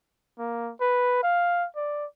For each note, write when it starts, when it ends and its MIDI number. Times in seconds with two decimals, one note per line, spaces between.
0.39 0.72 58
0.81 1.19 71
1.23 1.66 77
1.76 2.05 74